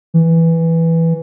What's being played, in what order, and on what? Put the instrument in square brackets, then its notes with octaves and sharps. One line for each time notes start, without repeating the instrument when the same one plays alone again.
[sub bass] E3